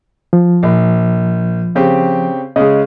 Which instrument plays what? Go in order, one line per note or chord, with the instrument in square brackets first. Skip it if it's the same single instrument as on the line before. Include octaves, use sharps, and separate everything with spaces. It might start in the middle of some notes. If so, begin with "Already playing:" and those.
[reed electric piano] F3
[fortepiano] A#1
C#3 C4 G4
[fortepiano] C#3 G#3 [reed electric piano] D#5